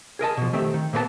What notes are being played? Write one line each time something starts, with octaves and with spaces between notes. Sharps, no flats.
G#4 A#4 D#5 A5
B2 F3
D#3 A3 C4 G4
D#3
A#2 A#3 B3 B4 A5